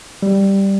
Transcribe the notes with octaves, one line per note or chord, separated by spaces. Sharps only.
G3